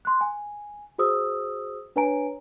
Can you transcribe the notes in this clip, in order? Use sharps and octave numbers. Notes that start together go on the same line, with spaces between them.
C6 F#6
G#5
F#4 G#4 C5 D#6 E6
D4 B4 C#5 G#5 A#5 D7